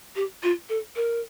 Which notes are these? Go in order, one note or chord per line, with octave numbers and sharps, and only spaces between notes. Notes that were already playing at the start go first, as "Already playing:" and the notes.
G4
F4
A4
A#4